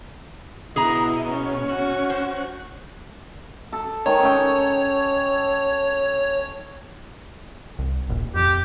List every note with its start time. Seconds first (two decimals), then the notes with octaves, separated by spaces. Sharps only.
0.76 B2 E4 G#4 D#5 A#5
1.31 C#4 C#5
1.69 F#4
2.10 C5
3.72 A4
4.06 D#3 C#5 G#5 C#6
4.23 C#4 A4 G5
7.79 C2
8.09 D#1 A#1
8.36 F2 G4